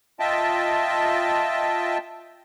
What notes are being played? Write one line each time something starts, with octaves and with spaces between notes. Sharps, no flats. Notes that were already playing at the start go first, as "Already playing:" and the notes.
F4 D#5 E5 G5 A5